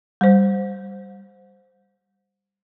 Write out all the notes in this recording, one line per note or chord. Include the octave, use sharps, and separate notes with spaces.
G3 C5